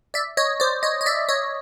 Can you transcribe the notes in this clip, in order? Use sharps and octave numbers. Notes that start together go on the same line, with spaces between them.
D5 E5
C#5 D#5
C5 D5
C#5 D#5
D#5
D5 E5
C#5 D#5